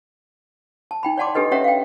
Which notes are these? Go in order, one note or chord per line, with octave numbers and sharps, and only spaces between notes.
A5
D#4 G5 B5
C#5 D5 F#5 A5 C6 D6
D4 G4 A4 B4 D#5
C#4 G4 C#5 E5 F#5 A#5
F5 G5